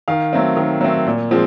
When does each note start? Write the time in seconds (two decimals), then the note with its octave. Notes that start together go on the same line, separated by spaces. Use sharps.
0.08 D#3 F5
0.33 F#3 A3 C4
0.57 D#3
0.81 F#3 A3 C4
1.06 A#2
1.31 F3 G#3 C4